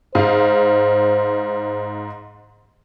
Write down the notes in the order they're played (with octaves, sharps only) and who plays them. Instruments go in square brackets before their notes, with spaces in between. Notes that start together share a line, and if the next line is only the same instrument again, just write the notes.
[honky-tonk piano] G#2 F5 [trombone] C5